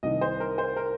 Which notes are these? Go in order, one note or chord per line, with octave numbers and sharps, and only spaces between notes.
C2 C3 D#3 D#5
C5
A#4
C5
A#4